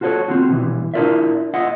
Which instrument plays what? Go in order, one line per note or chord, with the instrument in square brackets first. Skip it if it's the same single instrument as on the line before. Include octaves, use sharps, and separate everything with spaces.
[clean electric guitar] F4 F#4 A4 C5 C#5
C4 F4 F#4
B2 E3 G3
D4 E4 F4 A#4 D5 E5
F4 D#5 E5 F#5